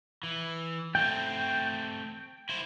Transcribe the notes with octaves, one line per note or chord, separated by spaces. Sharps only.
E3
A3 C4 G5
E4 C5